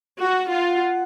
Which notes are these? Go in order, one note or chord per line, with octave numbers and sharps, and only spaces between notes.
F#4 F#5
F4
F#5